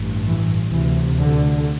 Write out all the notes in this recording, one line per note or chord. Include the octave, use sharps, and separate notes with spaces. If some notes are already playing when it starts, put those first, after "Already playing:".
Already playing: A1 G2
E3
D2 C3 E3
D3